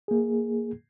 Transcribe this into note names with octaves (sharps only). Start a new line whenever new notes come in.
A#3 G#4